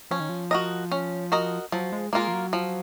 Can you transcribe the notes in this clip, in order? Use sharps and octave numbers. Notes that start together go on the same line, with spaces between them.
F3 C#4
D#3
F3
F#4 A#4 D#5
C#4
F#4 A#4 D#5
F3 F#3
G#3
G#3 A#3 F4 A#4
F3
F#3
F3